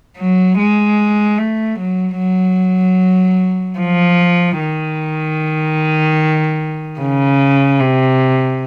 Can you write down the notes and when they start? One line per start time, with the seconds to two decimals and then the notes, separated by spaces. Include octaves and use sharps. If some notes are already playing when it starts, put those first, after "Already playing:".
0.18 F#3
0.59 G#3
1.38 A3
1.78 F#3
2.18 F#3
3.79 F3
4.59 D#3
6.99 C#3
7.80 C3